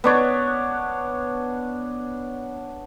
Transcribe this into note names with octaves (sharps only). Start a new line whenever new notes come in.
B3 D4 C#5